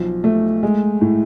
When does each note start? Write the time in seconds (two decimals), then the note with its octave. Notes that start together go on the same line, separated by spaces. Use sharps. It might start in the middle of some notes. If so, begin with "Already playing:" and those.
Already playing: B1 F3
0.24 A3
0.63 G#3
1.01 A2